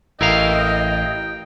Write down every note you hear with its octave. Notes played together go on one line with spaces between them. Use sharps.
A1 E4 A#4 D#5 F5 G5